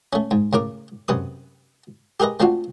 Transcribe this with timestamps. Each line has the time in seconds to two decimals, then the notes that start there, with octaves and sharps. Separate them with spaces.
0.13 A3 C#4
0.31 G#2
0.53 A2 C#3 A#4 D6
1.08 F#2 C3 B4 D#6
2.20 G4 G#4 A#4 B4 D#5
2.40 A3 C4 D4 F4 F#4